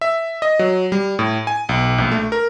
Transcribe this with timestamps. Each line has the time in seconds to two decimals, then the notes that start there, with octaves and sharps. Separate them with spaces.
0.01 E5
0.42 D#5
0.59 F#3
0.92 G3
1.19 A2
1.47 G#5
1.69 B1
1.98 A#1
2.12 A3
2.32 A#4